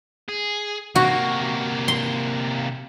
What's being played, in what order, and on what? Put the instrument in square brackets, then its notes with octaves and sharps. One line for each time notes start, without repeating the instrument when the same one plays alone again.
[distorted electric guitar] G#4
[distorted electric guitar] C3 A#3 [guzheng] F#4
[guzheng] C6